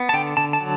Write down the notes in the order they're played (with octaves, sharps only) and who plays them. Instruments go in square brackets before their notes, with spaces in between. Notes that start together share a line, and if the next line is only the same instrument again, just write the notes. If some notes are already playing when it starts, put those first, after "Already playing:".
Already playing: [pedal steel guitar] B3
A5
D3 G5
D3 A5
A5
F#3